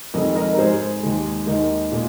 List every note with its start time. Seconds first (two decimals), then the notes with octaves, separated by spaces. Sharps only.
0.14 F2 D#3 G#3 A#4 D#5
0.36 A#4 D#5
0.53 A#4
0.58 G#2 G#3 G#4 C5
1.03 D#2 D#3 G#3
1.46 D#2 D#3 G#3 A#4 D#5
1.92 A#2 G#3